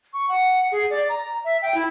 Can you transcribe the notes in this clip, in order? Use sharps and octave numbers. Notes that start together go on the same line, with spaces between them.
C#6
F#5
G#4
D5
A#5
E5
G5
E4